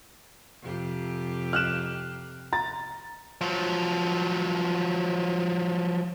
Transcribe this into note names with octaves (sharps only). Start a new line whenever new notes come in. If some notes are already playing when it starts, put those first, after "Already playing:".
F2 C3 G4
F6 F#6 E7
A#5 A6
F3 F#3